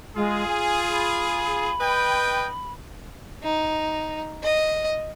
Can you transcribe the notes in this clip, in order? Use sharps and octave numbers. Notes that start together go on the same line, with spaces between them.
G#3 F4 G#4
G#5
B5
B4 D#5 G5
D#4
D#5